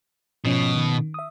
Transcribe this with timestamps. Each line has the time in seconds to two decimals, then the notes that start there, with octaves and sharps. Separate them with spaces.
0.45 G#2 B2 F3 C#4
0.75 D#3
1.14 E5 D#6